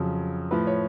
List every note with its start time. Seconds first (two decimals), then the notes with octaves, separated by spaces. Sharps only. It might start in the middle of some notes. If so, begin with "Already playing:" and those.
Already playing: F2 C#3 F#3
0.51 A2 F3 B4
0.67 C#5